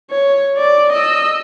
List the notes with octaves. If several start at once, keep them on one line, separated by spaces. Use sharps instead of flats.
C#5
D5
D#5 E6